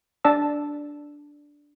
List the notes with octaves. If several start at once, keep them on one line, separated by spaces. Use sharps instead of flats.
D4 D5 A5 E6